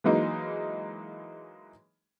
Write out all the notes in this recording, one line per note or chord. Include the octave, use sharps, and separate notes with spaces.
E3 F#3 G#3 A#3 D#4